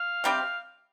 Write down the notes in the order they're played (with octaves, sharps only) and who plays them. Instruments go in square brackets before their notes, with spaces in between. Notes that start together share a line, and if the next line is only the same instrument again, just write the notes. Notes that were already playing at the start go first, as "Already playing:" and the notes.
Already playing: [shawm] F5
[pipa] C3 G3 C4 G4